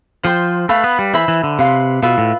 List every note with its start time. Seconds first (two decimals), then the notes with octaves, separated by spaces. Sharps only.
0.24 F3 C5 G5 C6
0.69 A3 B4 F5 B5
0.84 B3
0.99 G3
1.14 E3 C5 E5 B5
1.28 E3
1.44 D3
1.59 C3 B4 F5 C6
2.02 B2 F4 B4 E5
2.18 A2